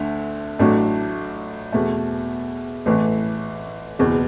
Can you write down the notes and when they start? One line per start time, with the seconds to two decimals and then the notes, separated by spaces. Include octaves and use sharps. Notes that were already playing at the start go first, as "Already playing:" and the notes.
Already playing: D2 D3 A3
0.59 A1 A2 F#3 A3 D4
1.72 E2 B2 A3
2.86 A1 A2 E3 A3
3.99 F#1 E2 B2 B3